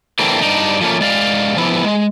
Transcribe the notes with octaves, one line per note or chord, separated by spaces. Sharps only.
E3 A3 A#3 C4 D4
G2 D4 D#4
F3 A3 A#3 C#4
G#3 D5 F5
F3 B3 E4
G#3